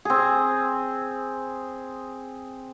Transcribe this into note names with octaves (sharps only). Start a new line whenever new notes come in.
C4 G#4